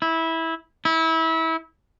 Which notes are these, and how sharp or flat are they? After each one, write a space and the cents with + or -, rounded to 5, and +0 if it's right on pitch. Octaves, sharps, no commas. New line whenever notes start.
E4 -15
E4 -25